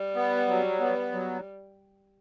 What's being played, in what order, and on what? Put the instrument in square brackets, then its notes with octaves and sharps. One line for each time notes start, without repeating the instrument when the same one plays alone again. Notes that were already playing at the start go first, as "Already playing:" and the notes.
Already playing: [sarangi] G3
[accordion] B3
F#3
B3
F#3